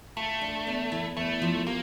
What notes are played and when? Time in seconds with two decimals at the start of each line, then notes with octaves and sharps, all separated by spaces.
0.17 A3 F4
0.41 D4
0.67 E2
0.92 E3
1.17 E2 A3
1.42 F3
1.67 A#3 G4